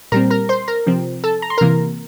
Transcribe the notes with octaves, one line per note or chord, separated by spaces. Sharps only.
A#2 G3 C4 A#4 A#5
A#4 A#5
C5 C6
A#4 A#5
C3 F3 C4
A4 A5
A#5
C6
C3 E3 A#3 A#4 A#5